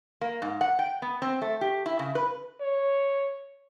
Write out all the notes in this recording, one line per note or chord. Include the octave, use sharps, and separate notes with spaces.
A#3
G#2
F#5
G5
B3
C4
A3
G4
E4
C#3
B4
C#5